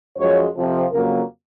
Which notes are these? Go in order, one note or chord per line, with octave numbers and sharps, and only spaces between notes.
F#2 F3 G#3 C#5
F2 C3 F3
F2 C#3 F#3 A#3 A#4